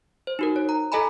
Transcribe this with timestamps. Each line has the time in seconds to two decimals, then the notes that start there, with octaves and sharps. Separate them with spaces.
0.27 C5
0.39 D#4 F#4 A#4
0.56 C#5
0.69 A#5
0.92 E4 A4 D#5 G#5 A#5 B5